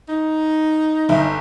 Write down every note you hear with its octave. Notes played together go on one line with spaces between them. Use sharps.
D#4
G1